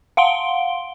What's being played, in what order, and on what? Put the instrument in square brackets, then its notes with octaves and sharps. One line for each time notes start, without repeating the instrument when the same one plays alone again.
[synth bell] F5 F#5 C6 D7 G7